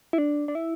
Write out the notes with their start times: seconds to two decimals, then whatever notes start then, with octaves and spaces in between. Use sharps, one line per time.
0.13 E4
0.18 D4
0.48 D4
0.55 E4